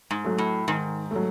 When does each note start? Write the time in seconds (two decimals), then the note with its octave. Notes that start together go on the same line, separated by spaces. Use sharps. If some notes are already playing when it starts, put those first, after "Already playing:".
0.11 G#2
0.24 F#3 A3
0.38 A2
0.68 G#2 D#3
1.11 F#3 A3